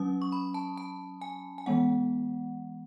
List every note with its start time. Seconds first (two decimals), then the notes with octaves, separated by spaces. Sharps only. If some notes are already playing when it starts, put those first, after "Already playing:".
Already playing: F#3 C#4 D#6
0.22 C#6
0.32 B5
0.54 A5
0.77 A5
1.21 G#5
1.58 G#5
1.66 E3 G#3 B3 F#5